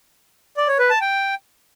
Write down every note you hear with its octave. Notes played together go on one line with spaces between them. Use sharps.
D5
C#5
B4
A5
G5